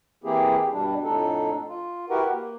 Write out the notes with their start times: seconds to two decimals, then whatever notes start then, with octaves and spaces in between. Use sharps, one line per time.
0.24 E3 A#3 C4 E4 G4 G#4
0.72 G2 B2 G3 D4
1.04 F2 A2 D4 D#4 A4
1.68 F4
2.10 E4 F#4 G4 A#4 B4 F#5
2.32 A#3